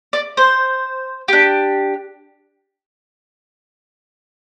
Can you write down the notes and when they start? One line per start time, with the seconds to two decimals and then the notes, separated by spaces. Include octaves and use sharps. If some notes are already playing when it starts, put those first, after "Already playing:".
0.13 D5
0.37 C5
1.28 D4 G4